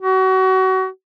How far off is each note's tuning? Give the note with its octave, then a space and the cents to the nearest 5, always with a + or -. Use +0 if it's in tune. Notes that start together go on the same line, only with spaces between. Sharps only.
F#4 +30